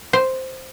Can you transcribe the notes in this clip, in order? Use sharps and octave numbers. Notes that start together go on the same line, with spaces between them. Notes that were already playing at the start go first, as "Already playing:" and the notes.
C5